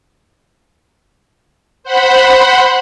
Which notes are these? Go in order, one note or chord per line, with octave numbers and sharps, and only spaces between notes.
C5 F#5 B5